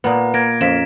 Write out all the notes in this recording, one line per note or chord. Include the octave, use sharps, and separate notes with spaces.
A#2 A#3 B3 B4 F#5 A#5
A#3 G#6 A#6 D7
F2 C#4 F5 A#5 B6 E7